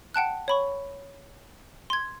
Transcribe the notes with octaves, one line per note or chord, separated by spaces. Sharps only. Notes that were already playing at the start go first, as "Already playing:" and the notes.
F#5 G5 A5 F#6
C#5 B5 C#6
C6 G#6